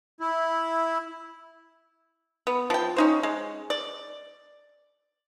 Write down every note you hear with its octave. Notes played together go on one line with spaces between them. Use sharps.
E4
B3
F3 G5
C#4 D#4 C5
G#3
D5